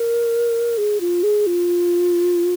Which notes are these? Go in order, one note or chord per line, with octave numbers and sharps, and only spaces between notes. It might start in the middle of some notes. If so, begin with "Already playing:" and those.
Already playing: A#4
G#4
F4
G#4
F4